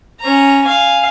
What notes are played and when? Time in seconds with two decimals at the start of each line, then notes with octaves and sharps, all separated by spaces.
0.20 C#4 A#5
0.65 F5 G#5